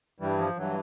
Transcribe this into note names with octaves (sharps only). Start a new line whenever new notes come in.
G2 E3 G3
F3
G2 E3 F#3